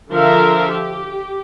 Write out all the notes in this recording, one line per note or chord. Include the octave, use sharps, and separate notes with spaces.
D3 F3 A#4 E5 F5
G4